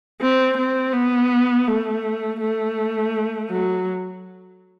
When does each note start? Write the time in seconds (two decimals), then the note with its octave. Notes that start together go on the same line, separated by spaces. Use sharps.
0.22 C4
0.58 C4
0.94 B3
1.68 A3
2.41 A3
3.50 F#3